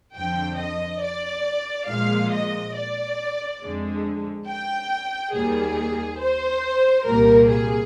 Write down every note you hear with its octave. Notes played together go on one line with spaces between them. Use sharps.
F2 D3 F3 G5
D#5
D5
A#2 F3 G#3 F5
D#5
D5
F2 D3 G#3
G5
D#2 D#3 G3 A#3 G#4
C5
C2 A#2 G3 A#3 A#4
G#4